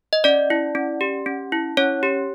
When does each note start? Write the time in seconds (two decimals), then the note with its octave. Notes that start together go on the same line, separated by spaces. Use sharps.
0.13 D#5
0.24 C#4 D5
0.50 E4
0.75 C#4
1.01 G4
1.26 C#4
1.52 E4
1.77 C#4 C#5
2.03 G4